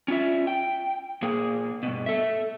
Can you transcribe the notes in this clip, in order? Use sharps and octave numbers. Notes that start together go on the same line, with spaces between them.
C#4 F4 E5
G5
A#2 A#3 G#4
G2 B2
A4 E5